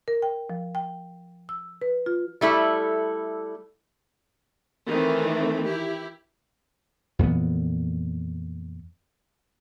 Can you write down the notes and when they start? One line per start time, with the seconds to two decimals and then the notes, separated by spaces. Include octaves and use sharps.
0.08 A#4
0.22 G5
0.50 F3
0.75 G5
1.49 E6
1.82 B4
2.06 F4
2.41 G3 A3 E4 A4
4.88 D#3 E3 A3 C4
5.65 E4 G4
7.19 F2 A#2 E3 B3